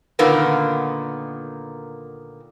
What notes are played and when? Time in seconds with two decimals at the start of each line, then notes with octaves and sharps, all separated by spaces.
0.19 A#2 D3 D#3 A#3 B3